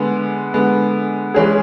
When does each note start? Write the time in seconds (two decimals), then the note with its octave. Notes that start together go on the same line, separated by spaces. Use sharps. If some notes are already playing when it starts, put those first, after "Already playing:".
Already playing: D3 G#3 B3
0.54 D3 G#3 B3
1.34 E3 G#3 C#4 G#4